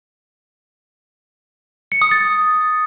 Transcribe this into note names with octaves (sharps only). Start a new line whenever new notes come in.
C#7
D#6
A6